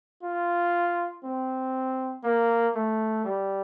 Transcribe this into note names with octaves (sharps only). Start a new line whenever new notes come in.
F4
C4
A#3
A3
G3